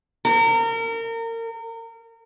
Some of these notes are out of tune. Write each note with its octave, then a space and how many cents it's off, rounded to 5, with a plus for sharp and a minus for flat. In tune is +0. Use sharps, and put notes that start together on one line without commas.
A#4 -30